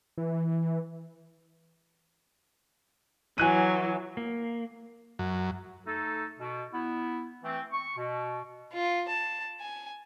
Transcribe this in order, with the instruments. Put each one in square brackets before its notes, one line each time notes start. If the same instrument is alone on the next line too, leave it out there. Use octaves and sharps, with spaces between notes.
[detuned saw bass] E3
[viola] E3 F#3 [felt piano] G#5 F#6 D#7
[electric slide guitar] A#3
[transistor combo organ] F#2
[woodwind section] A3 D#4 A4
B2
B3 E4
E3 A3 C4
C#6
B2
[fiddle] F4
A5
G#5